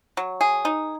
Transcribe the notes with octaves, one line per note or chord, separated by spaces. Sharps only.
F#3
G#4
D#4